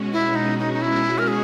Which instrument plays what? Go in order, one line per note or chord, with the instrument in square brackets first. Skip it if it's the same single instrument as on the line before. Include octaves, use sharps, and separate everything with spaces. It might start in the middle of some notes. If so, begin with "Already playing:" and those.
Already playing: [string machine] B2 G#3 C#4 F#4
[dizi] E4
D#4
D#4
D#4
E4
A#4
G#4